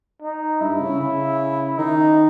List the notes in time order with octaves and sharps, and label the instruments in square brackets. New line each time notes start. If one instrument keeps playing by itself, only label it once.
[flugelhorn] D#4
[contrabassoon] G2 [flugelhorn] E4
[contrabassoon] C#3
C#3
[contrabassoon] D#3 [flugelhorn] D#4